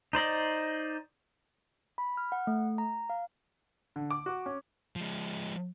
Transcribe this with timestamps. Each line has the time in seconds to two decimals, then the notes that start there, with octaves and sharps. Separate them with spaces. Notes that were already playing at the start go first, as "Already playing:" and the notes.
0.13 D#4 C5 D5 D#5
1.98 B5
2.17 F6
2.32 F#5
2.47 A3
2.78 A#5
3.10 F5
3.96 D3
4.11 D6
4.26 F#4
4.46 C#4
4.96 F3 G#3